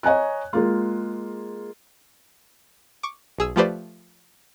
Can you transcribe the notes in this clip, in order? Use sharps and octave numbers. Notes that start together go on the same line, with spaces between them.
C#5 D#5 G#5 A#5 F#6
G#3 A#3 F4
C#6 D6
B1 G#4 E6
F3 A3 G4 B4 C5 D5